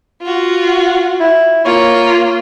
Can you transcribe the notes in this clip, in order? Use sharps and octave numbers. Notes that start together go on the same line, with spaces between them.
F4 F#4
E4
A#3 F4 C#5